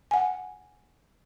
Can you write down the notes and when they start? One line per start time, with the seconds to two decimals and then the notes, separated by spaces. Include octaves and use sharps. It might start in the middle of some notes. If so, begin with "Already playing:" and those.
0.11 F#5 G#5